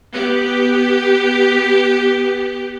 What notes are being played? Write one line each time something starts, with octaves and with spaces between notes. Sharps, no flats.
B3 G4